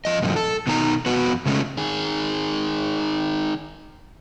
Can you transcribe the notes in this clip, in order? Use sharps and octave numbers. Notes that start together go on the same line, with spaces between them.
F3 D#5
G2 A#2 D3 F3 F#3
A4
B2 D#3 D#4 A5 A#5
F2 B3 F#4 B4
C#3 G#3 A3 C#4
D#3 G#4